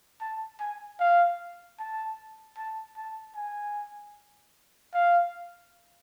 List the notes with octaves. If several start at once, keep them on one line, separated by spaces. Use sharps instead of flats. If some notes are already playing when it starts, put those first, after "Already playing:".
A5
G#5
F5
A5
A5
A5
G#5
F5